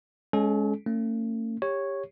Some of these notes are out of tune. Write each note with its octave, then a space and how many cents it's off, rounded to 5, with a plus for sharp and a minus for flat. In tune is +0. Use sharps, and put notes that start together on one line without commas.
G#3 +0 C#4 +0 A4 -40
A3 +45 C#4 +0
G4 +20 C#5 -5